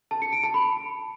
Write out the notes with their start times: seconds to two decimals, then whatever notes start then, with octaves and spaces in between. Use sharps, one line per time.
0.11 A5
0.22 C#7
0.33 D7
0.43 A5
0.54 B5